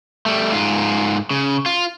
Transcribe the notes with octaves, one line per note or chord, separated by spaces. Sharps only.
G3 A3
G#2 F4
C#3
F4